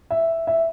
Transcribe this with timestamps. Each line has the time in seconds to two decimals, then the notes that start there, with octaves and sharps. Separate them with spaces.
0.10 E5
0.47 E5